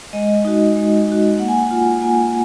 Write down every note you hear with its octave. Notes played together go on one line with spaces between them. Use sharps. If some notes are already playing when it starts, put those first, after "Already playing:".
G#3 D#5
D#4 F#4
G#3
D#4 F#4
A#3 F#5
G#5
F#5
F4
A#3 G#5